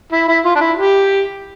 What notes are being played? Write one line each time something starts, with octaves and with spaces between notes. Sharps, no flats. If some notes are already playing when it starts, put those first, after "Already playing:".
E4
E4
F4
D4
E4
G4